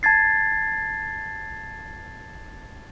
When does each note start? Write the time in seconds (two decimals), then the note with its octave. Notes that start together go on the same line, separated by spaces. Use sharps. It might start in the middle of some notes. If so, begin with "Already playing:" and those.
0.03 A5 G#6 A6 C7